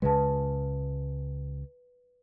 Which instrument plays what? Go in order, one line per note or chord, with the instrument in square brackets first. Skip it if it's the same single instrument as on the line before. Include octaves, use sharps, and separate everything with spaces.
[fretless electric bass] C#2 C#3 G#3 [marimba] B4 A5